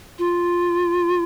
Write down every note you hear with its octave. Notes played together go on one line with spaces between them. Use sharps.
F4